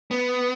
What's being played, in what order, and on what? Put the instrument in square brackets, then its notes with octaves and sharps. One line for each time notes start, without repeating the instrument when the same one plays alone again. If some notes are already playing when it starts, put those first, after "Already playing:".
[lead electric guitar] B3